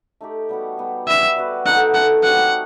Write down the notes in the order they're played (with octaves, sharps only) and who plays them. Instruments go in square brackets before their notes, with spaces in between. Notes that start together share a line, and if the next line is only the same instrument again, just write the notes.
[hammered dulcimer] A3 D#4 G4
G3 B3 F#4
G3 B3 F#4
[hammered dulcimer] G3 B3 F#4 B4 [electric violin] E5
[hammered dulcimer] G3 B3 F#4 B4
[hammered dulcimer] A3 D#4 F#4 A4 [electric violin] F#5
[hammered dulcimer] A3 D#4 F#4 A4 [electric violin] F#5
[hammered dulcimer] G3 C4 F#4 [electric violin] F#5